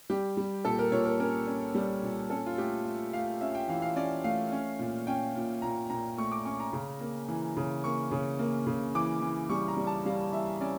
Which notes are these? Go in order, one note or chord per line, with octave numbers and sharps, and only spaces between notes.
G3 G4
G3
A#2 A4
A#4
A#2 C#5
A#4
C#4 A#4
C#4
G3
A#2
C#4 A4
F4
A3 G4
A3
A3 F5
C#4 E5
G5
E3 F5
F5
C#4 D5
A3 F5
C#4
A#2
C#4 G5
A#2
A#2 A#5
A#2 A#5
A3 C#6
D6
C#4 C#6
A#5
C#3
A#3
E3
C#3
A#3 C#6
C#3
A#3
C#3
E3 D6
E3
G3 C#6
A#5
G3
A5
G3 F5
E3 E5
C#4 D5